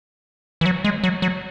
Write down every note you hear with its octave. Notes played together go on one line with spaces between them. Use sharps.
E3
F#3
G#3
F#3
F#3